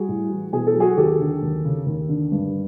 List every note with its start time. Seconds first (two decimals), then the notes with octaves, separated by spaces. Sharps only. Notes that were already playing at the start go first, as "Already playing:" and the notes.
Already playing: G3 F#4 G#4
0.09 A2
0.31 E3
0.52 B2 G#4
0.67 A4
0.75 F#3
0.80 F#4 G#4
0.97 D#2 G4 A4
1.20 D3
1.42 D#2
1.65 C#3
1.86 D#2
2.09 D3
2.32 G2